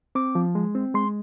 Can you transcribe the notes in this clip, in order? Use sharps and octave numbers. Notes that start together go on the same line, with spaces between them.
C4 D6
F3
G#3
C4
G#3 C6